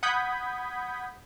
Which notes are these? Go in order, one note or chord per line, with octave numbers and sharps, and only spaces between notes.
F#5 B5 D#6 G6 G#6 B6